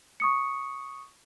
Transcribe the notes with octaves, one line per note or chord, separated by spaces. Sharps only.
C#6 D#6 C#7